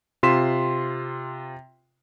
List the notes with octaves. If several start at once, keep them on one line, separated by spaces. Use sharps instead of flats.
C3 F4 C6 B6 E7